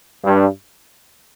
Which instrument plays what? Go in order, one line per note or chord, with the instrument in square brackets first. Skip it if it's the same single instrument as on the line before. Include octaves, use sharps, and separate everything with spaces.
[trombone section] G2